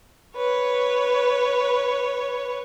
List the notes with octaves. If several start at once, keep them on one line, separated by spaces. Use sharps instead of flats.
B4 C#5